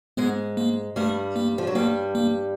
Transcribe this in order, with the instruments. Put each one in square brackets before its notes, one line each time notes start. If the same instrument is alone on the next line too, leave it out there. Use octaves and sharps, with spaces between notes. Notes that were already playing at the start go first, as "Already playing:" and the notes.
[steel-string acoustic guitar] G#2 G#3 [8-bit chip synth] B3
[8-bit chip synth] A#3
[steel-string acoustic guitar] G2 G3 [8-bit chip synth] A3
[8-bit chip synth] A#3
[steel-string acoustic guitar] F3
F#3
[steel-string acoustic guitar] G2 G3 [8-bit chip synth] A#3
[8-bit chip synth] A#3